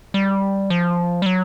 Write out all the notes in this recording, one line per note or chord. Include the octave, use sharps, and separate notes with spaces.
G3
F3
G3
F#3